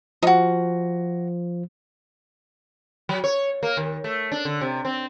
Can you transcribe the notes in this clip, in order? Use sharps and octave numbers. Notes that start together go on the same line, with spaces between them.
F3 D#4 F#4
F#3
C#5
A#3
D#2
A3
D4
D3
C3
C4